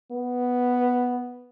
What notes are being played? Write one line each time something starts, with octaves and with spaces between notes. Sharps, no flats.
B3